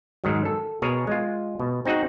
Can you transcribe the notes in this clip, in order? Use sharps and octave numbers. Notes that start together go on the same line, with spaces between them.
G#2 D#3 F#3
A4
B2 G#4 A#4 C#5
G#3 F4
B2
C4 D#4 F#4 G#4 F#5